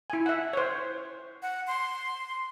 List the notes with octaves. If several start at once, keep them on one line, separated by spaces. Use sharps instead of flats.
E4 G#5
E5 F#5
C5 C#5
F#5
C6